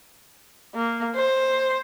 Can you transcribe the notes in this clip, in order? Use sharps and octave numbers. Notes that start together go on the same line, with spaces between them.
A#3
C5